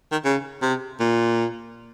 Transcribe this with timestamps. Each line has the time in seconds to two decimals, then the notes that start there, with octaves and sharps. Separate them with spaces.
0.12 D#3
0.25 C#3
0.62 C3
1.00 A#2